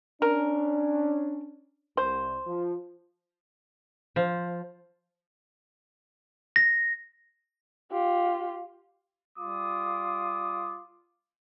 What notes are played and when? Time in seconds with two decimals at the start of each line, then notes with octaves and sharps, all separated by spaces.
0.22 C#4 D4 A#4
1.97 C2 C5
2.46 F3
4.16 F3
6.56 A#6
7.92 F4 G4
9.38 G3 F4 D6 D#6